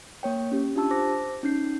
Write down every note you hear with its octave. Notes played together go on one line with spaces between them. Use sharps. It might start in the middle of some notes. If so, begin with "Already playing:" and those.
A#3 C#5 G5
C#4 G4
D4 F4 G4 A5 E6
C5 D6 A#6
C#4 D#4 G6 C7